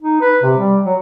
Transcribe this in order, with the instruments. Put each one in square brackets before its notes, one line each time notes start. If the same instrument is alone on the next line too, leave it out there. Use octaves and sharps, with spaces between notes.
[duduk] D#4
B4
C3
G3
F#3